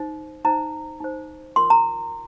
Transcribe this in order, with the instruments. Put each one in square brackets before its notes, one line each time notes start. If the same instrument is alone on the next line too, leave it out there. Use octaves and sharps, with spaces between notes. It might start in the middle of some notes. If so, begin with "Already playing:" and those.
Already playing: [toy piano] D#4 C5
D#4 C5 A#5
D#4 C5
F4 A#4 C6
A#5